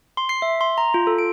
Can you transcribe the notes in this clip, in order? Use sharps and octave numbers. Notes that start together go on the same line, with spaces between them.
C6
C7
E5
C6
A#5
F4
A4
D7